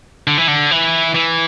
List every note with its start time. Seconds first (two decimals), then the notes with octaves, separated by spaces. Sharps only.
0.27 D3
0.38 E3
0.48 D3
0.71 E3
1.15 E3